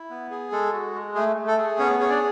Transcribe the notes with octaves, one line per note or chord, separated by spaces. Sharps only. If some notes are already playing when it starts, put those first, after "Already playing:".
Already playing: E4
B3
G#4
G#3 A4
F#4
G#3
A3 G#4
A3
A4
G#4
B3 C#4 C#5
G#4 C#5
D4 D5